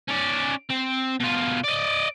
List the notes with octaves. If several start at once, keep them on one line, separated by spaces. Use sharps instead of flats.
C#4 D5
C4
B2 F4
D5 D#5